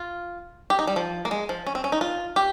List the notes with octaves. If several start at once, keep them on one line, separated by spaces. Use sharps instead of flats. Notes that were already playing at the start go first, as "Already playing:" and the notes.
Already playing: F4
G4
D#4
G3
F3
A#3
G#3
F3
C#4
C4
C#4
D#4
F4
G4